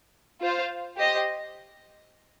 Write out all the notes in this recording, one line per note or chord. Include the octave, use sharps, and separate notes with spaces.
F4 C5 F5
G4 C5 D#5